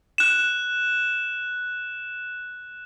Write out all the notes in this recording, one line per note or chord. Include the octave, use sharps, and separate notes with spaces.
F#6 E7